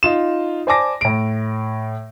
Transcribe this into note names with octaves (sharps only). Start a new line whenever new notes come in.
D#4 F4 E7
C5 D5 G#5 A5 D6 A#6
A2 D7